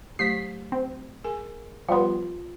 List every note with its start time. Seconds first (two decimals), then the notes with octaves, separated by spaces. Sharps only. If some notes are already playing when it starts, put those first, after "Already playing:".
0.19 F#3 A3 G4 B6 C7
0.72 C4
1.24 G#4 A#4 G#5
1.89 F3 G3 B3 F4 C6